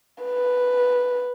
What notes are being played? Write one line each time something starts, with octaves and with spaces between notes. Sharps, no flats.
B4